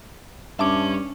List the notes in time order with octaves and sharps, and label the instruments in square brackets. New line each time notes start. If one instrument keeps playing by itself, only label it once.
[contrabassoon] G2 [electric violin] C#4 [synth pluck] E5 A5 D6